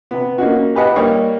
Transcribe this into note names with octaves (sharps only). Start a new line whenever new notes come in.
C3 B3
A#3 C#4 D#4 F#4
G4 B4 D#5 F#5
G3 A#3 D#4 C#5 D#5